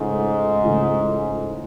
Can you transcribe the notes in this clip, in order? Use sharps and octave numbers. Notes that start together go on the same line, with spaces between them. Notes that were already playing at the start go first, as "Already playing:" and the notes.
Already playing: C#2 G#2 C#3 A3
C#2 C#3 E3 A3